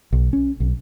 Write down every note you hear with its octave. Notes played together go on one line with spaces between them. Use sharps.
B1
C#4
B1